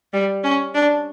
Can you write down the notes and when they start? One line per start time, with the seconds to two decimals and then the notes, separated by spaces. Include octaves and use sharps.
0.13 G3
0.43 C#4
0.74 D4